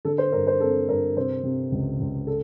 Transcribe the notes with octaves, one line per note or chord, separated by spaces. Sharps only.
D3 A4
C5
G2 A#4
C5
C4 A4
G2 A#4
C3 C5
C3
C#2
C#2
A4